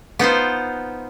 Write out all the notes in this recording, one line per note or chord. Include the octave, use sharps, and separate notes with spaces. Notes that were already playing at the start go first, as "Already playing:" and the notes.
B3 D#4 F4 C5